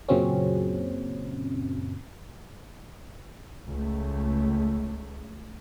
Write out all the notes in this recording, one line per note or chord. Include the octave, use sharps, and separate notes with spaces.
F#2 A#2 C#3 F#3 C4 C#4
C#2 A3